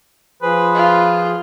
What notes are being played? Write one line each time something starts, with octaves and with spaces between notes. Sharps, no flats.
F3 G#4 B4 C5
F4